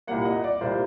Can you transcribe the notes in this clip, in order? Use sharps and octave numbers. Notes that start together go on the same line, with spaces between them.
C2 A#2 G3 A#3 F#5
D#5
D5
C2 A#2 G3 A#3 C5